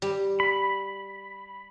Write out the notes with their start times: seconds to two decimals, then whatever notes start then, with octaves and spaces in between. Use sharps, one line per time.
0.02 G3
0.40 B5